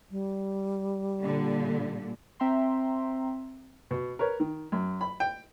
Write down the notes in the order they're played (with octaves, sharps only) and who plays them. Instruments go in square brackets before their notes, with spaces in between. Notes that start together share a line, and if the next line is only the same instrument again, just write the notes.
[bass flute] G3
[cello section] A#2 D3
[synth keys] C4 E5 G5 A#5 C6
[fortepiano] B2
A#4 B4 C#5
D#3
F#2
B5
G5